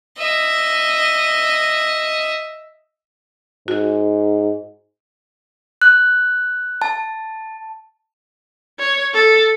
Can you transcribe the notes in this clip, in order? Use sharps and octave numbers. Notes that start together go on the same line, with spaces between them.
D#5 E5
G#2 F#4
F#6
A5
C#5
A4